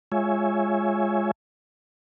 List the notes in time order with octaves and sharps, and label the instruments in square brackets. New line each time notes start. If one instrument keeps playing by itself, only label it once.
[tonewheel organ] G#3 F4 C#5 E5 G#5